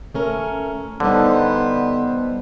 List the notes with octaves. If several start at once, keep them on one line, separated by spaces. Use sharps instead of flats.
A3 C#4 A#4
D3 G3 B3 D#4 C5